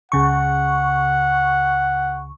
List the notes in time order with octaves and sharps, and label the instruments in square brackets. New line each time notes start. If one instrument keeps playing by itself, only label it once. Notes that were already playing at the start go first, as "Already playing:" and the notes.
[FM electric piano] C#2 C#3 C#6 [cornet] F#5